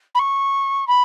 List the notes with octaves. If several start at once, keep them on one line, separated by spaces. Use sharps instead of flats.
B5
C#6
B5